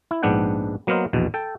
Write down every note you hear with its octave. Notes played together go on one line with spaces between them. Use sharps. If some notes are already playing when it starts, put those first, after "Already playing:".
E4
A#1 G#2 B3 D4 F#5 G5
F#3 A#3 B3 A#4 C5 D#5
A#1 E2 B2
A4 G5